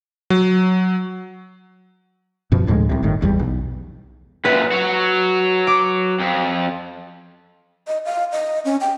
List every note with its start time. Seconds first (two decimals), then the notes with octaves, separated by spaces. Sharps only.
0.30 F#3
2.52 F#2 B2 F3
2.67 D2 A2 F3 G#3
2.89 C2 C3
3.03 G1 A2 D#3
3.21 G#1 E2 B2 G3
3.39 B1
4.45 F#2 A#2 B4
4.72 F#3 F#4
5.67 D6
6.19 F2
7.87 D#5
8.05 F5
8.32 D#5
8.65 C#4
8.81 G5